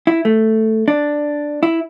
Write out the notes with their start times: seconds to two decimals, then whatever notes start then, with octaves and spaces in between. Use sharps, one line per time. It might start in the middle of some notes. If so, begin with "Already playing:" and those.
0.07 E4
0.25 A3
0.88 D4
1.63 E4